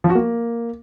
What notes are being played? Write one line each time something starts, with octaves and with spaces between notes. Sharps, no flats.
F3
F#4
A#3